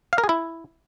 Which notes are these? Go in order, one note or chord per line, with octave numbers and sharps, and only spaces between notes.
F5
A#4
G#4
E4